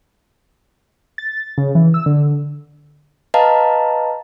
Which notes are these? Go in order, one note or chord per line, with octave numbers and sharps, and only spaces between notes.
A6
C#3
E3
E6
D3
B4 D#5 F5 A5 A#5